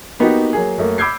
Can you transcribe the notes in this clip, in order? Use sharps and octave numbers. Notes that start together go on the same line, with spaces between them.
A#3 B3 D#4 F#4 G4
F#3 A#3 G#4
F#2 A3 A#3
B5 D6 E6 G6 G#6 C7